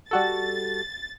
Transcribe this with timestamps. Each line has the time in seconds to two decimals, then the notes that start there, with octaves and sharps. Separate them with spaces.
0.11 G3 F#4 A4 A6